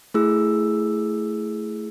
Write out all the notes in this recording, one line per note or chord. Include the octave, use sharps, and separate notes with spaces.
A3 E4 G#4 E6